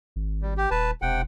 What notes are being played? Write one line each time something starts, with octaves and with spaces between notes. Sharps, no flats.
G#1
G3
G4
D#1 B4 A5
E1 C3 F#5 G5